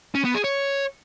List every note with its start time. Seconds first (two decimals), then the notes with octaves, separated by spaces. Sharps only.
0.15 C#4
0.25 B3
0.34 G#4
0.44 C#5